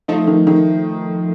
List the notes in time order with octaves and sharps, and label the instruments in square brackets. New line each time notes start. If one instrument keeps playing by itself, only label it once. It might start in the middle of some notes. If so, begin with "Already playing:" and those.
[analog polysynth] F3 A3 [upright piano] D#4
[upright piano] D#3
D#3